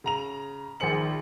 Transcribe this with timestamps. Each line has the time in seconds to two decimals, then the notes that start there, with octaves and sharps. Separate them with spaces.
0.04 C#3 A#5 F7
0.80 A#1 D#3 G#4 C5 C#7 F#7